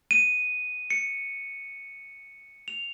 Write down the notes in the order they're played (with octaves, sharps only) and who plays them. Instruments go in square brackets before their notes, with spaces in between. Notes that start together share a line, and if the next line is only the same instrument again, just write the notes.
[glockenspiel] D#7
C#7
F7